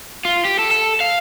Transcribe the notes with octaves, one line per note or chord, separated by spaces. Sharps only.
F4
G4
A4
A4
F5